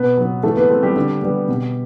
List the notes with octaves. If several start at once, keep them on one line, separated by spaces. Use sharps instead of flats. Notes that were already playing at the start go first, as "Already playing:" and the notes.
Already playing: B2 B3 B4
F#3 B3
E3 A3 A4
B3 B4
A3 C4
G3 G4
D3
G3 B3
B2